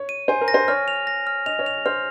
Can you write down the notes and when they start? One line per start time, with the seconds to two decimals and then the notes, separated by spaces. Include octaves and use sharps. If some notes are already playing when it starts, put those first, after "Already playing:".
Already playing: C#5
0.09 D#7
0.28 C5 G#5
0.41 A#4
0.48 A#6
0.54 C5
0.68 C#5 F6
0.88 F7
1.07 A#6
1.27 F6
1.46 D#5 F7
1.59 C#5
1.66 F7
1.86 C5 F6